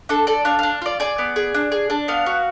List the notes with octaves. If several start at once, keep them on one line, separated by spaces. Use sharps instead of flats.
D4 A4
A4 D5
D4 F5
D4 F5
F4 D5
G#4 D5
B3
G#4
D4
G#4
D4
B3 F5
F#4